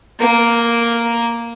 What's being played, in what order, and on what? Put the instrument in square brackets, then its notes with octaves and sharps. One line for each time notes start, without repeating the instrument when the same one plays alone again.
[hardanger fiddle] A#3 A#4